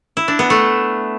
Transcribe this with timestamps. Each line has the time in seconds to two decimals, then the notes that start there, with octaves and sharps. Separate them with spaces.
0.17 E4
0.28 D4
0.39 B3
0.50 A3